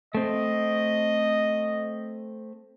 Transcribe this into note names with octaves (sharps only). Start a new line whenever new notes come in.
A3 C4 D#5